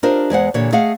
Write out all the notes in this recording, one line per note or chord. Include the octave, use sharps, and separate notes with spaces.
D4 F4 G4 A#4 C5 D#5
E2 G#3 C5 F#5
A#2 D3 E3 G4 C#5
A3 G#4 D#5 F5 F#5